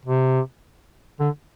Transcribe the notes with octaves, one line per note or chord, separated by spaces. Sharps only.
C3
D3